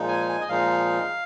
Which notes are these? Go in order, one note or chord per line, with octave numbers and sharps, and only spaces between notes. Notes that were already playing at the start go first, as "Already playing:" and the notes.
Already playing: A#2 F3 G#3 D#4
G#5
G#5
D#5
A#2 F3 G#3 D#4 F5